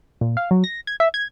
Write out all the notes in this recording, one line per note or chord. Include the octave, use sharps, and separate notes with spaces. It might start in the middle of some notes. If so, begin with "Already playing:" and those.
A#2
F5
F#3
A#6
G#6
E5
G#6